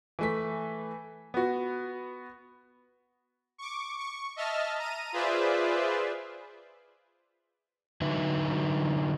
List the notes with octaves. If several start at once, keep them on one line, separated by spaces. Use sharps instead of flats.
E3 A3 B6
B3 F#4
C#6 D6
C#6
D#5 E5 A5 F6
A#5 D#7
F4 G#4 B4 C5 D5 E5
D3 F#3 D#4 B4 E5